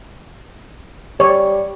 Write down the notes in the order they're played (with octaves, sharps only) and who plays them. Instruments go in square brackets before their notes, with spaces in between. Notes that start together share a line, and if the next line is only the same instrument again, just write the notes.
[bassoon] G3 [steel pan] C#5 D5